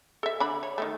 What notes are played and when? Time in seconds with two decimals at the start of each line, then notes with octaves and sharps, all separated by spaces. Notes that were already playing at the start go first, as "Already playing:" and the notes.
0.23 A4 E5
0.40 D3 D5 B5
0.63 C#5
0.78 D#3 G#3 A3